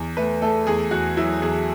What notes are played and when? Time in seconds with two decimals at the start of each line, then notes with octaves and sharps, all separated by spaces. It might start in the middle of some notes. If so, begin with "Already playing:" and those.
Already playing: E2
0.17 A3 B4
0.42 A3 A4
0.67 E2 G#4
0.91 E2 F#4
1.17 F#3 E4
1.41 E2 G#4